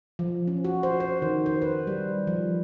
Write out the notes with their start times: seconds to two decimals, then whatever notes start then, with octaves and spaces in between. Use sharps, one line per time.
0.19 F3
0.48 C#4
0.65 F#4
0.83 C5
1.00 C5
1.22 D#3
1.46 C5
1.62 B4
1.87 G3
2.27 F3